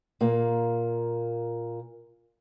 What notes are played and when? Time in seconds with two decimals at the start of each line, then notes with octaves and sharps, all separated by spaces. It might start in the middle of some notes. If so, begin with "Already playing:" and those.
0.21 A#2 A#3